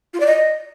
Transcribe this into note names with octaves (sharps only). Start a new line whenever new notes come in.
F4
D5
D#5